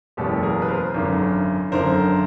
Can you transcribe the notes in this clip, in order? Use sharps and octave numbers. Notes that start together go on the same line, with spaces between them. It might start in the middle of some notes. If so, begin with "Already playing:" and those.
F#1 E2 B2 G#3 G4 A4
G#4 A#4
B4
A#4 C5
G#1 F#2 D3
G#1 F#2 D3 A#4 C5